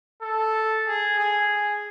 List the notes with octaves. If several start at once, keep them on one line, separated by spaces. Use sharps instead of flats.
A4
G#4
G#4